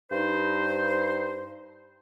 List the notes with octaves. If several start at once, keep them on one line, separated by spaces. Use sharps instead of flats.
G2 D#4 C5